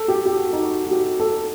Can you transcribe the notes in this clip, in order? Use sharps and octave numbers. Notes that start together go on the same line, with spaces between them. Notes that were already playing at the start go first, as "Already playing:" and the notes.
Already playing: A4
G4
G4
F#4
D#4
F#4
F#4
G4
A4